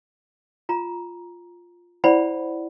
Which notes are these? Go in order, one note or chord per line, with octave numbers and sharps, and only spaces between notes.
F4 A#5
E4 C5 D5 F#5 B5